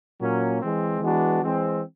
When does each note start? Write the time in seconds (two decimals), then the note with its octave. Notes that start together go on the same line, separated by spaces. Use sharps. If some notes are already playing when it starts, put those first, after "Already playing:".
0.20 A#2 F#3 A#3 C#4
0.61 E3 G#3 C4
1.01 E3 G#3 B3 D4 F#4
1.42 E3 G#3 C4